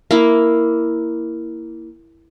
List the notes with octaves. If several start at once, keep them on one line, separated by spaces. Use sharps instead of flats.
A#3 E4